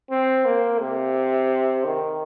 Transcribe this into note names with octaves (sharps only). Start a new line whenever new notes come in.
C4
A#3
C3
D#3